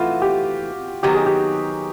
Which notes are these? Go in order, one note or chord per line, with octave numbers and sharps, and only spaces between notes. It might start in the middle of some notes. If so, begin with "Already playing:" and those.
Already playing: E3 A3 F4 F#4
G4
D#3 F#3 B3 D#4 G4
G#4
G4